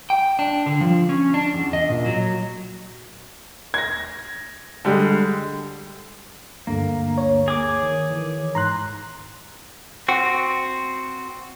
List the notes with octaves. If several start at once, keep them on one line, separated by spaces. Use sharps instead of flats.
G5
D4
D3
F3
C#4
D4
E2
D#5
A#2
F#3
G#6 A#6
D3 G3 G#3
D2 G2 D3 A#3
C#5
G#4 D6
D#3
D#3 E3
G#2 A#5 C6 F#6
C4 F#4